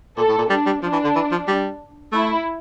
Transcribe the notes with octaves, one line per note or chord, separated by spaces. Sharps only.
A#2 A4
A2
A#2
G3 D4
G3
F3 D4
E3
D3
E3
F3
G3
A3 E4